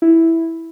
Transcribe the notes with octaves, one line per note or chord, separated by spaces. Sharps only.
E4